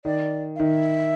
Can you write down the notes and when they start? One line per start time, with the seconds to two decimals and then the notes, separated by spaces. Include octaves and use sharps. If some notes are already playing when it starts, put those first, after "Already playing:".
0.05 D#3 D5
0.56 F5
0.60 D#3 E5